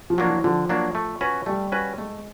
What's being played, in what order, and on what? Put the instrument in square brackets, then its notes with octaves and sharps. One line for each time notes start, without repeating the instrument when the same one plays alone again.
[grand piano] F3
[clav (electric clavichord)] F#3 A#3 D4
[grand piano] E3
[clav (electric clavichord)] D3 [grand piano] F3
[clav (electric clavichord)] F#3 A#3 D4
A3
C#4 F#4 B4
[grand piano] G3 [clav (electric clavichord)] A3
[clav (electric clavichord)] C#4 F#4 B4
[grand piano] G#3 [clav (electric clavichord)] A3